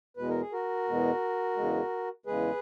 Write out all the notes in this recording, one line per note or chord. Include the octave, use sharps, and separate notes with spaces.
E2 B2 G#3 B4
A#4
G#4
F#4 A#4
E2 B2 G#3
E2 C#3 G#3
E2 C#3 G#3 G#4 B4